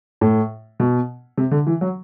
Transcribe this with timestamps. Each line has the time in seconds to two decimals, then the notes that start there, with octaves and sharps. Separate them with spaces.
0.21 A2
0.80 B2
1.38 C3
1.51 D3
1.67 E3
1.81 F#3